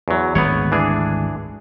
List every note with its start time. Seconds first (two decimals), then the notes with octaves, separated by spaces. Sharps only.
0.08 E2 F#3
0.35 G#1 D2 G#3 B3 C#5
0.72 E3 D4 G#4